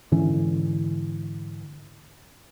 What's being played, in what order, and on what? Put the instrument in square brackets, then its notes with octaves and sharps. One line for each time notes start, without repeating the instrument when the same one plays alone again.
[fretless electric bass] G#2 D3 E3 C#4